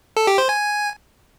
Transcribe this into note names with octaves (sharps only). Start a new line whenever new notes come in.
A4
G4
C5
G#5